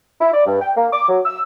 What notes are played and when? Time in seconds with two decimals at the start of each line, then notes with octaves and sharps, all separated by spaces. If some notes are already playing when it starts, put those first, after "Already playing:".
0.20 E4
0.34 D5
0.46 G2
0.61 G5
0.76 A#3
0.92 D6
1.09 F#3
1.25 E6